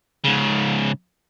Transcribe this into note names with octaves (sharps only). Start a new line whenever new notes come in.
G#2 C#3